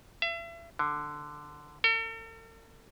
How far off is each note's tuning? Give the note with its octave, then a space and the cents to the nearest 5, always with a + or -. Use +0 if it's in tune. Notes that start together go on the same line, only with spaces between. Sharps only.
E5 +40
D3 +10
A4 +45